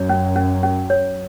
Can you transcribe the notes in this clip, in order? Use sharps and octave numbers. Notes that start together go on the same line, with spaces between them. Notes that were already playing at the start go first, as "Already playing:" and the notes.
Already playing: F#2 F#3 C#5
C#4
C#4
C#4
C#5